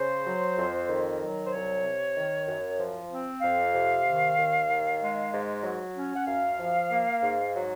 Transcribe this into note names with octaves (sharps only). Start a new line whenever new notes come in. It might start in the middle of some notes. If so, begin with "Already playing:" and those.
Already playing: C#3 C5
F#3
F2
D#3
F#3
C5
C2 C#5
C3
D#3
F#2
F3
C4
F2 F5
C3
D#3
D#2
D#3
G#3
G#2
F#3
C#4
F#5
F#2 F5
F3
A#3
G#2
F#3